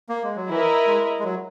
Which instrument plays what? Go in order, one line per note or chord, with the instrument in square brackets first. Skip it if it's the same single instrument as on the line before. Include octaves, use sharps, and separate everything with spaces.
[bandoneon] A#3
G#3
F#3
[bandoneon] E3 [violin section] E4 A#4 D#5
[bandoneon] G#3
G#3
F#3